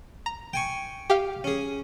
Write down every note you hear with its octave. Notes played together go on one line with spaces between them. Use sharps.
A#5
G5 G#5 C#6
G4 F5
C#4 G#4